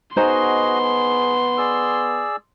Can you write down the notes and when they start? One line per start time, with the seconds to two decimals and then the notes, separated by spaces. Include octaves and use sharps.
0.17 B3 D#4 F#4 G#4 C5 D#5 A#5 C6
0.83 G#4
1.58 G#4 D5 E6